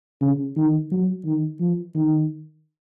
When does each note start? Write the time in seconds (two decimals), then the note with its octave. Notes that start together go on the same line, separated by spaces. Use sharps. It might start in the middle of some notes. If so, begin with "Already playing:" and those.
0.22 C#3
0.56 D#3
0.91 F#3
1.25 D#3
1.60 F3
1.95 D#3